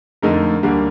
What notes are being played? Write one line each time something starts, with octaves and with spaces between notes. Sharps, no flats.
F2 D3 A3 D#4 A#4
D2 D3 G3 A#3